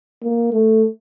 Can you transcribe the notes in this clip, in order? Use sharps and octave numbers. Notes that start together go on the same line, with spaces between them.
A#3
A3